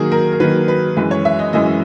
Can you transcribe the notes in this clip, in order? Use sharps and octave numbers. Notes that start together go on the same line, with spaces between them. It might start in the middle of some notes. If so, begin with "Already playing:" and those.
Already playing: D#3 F#3 A#3 G#4 A#4
A#4
A#4
D#3 F#3 A#3 B4
B4
F#2 E3 G#3 B4
C#5
E5
D#5
F#2 E3 G#3 D#5